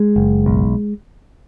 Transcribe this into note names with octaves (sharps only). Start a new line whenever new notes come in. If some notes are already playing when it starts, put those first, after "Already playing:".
Already playing: G#3
F#1
B1